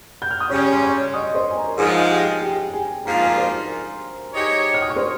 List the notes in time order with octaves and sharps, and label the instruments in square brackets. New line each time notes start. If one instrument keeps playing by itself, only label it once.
[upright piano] G6
F6
D#6
[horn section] C#3 G3 C#4 [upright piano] C#5 C#6
[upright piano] C6
C#5 C#6
D#5 D#6
C5 C6
G#5
A#4 A#5
[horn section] G#2 F3 G#3 [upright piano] G#4 G#5
[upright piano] G4 G5
G4 G5
G5
G#4 G#5
[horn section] G#2 F3 A#3 F4 [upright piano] A#5
[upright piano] G#5
A#4 A#5
C5 C6
[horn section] G#3 D#4 G4 C#5
[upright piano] F6
D#6
C#6
C5 C6